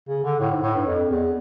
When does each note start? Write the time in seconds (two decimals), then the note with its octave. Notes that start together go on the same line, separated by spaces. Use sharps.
0.08 C#3
0.24 D3
0.40 A2
0.51 G#2
0.62 A2
0.75 G2
0.86 F2
1.09 E2